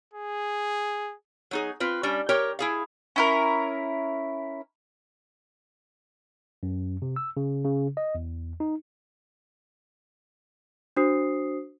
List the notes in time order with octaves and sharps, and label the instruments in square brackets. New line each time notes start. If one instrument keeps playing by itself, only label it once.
[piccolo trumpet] G#4
[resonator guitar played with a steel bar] F#3 D#4 G#4
C4 F4 B4
G3 C#4 D4
G4 A#4 C#5 G5
E4 G#4 F5
[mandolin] C#4 E4 A#4
[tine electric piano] F#2
C3
E6
C#3
C#3
D#5
E2
D#4
[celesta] D4 F#4 C5 D#6 C7